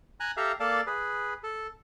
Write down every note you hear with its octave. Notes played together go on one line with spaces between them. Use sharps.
G#5 A#5 F#6
G4 A4 E5 F5 A#5
A#3 A4 D5 F5 A5
G#4 B4
A4